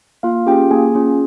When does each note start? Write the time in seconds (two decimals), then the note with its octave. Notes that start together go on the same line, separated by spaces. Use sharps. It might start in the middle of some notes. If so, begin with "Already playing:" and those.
0.23 A#3 F4 F5
0.47 C#4 F4 G4 G#4 G5
0.71 A#3 G#4 G#5
0.94 C#4 F4 G#4